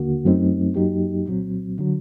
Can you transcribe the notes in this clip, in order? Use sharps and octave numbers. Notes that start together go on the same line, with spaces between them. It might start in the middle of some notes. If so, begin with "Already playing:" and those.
Already playing: D#2 D3 A#3 F#4
F#2 F#3 A3 C4 D#4
F#2 F#3 A#3 D#4 G4
C2 A#2 F#3 C4
D3 F#3